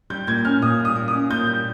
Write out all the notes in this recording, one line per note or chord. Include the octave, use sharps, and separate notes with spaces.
G3 G6
A#2 G#6
C#4 F6
A#2 D#6
G3
D#6
A#2
D#6
C#4
A#2 G6
G3